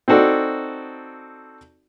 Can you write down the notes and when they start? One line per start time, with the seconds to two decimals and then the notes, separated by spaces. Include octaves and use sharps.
0.08 C4 D#4 F#4 A4 D5